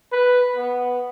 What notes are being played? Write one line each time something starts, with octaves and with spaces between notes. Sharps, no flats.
B4
B3